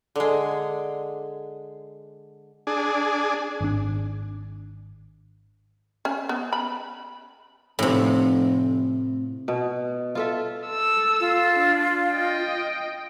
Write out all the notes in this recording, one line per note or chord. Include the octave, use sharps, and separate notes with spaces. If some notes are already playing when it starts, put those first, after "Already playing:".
D3 G#3
D4 G#4
G#1 D4
C#4
B3
B5
F1 A2 C3
B2
F4 A4 E5
A4 E6
F4
D4
D#5 G5